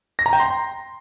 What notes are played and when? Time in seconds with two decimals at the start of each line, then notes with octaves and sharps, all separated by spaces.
0.19 A#6
0.26 A#5
0.33 G5
0.40 C6